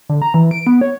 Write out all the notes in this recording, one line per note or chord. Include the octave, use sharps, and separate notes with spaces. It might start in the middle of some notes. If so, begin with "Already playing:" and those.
D3
A#5
E3
D7
B3
C#5